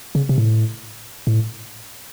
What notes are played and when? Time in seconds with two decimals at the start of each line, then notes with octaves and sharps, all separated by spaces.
0.15 C#3
0.29 C3
0.38 A2
1.27 A2